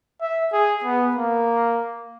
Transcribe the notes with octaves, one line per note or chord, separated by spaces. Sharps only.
E5
G#4
B3
A#3